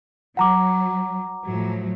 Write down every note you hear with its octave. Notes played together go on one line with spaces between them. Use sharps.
F#3 F#5 A#5 D6
A2 F3 F#3